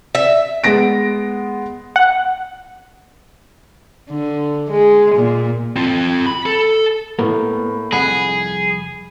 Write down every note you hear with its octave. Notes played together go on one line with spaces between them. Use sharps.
E5
G#3 B3 A#6 D7
F#5
D3
G#3
A#2
C4 F4
B5
A4
A2 A#3 B3 A#4
C2 F2 G#4 F#5 B5